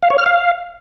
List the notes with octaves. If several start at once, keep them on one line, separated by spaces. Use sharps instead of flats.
F5
C#5
F6
F5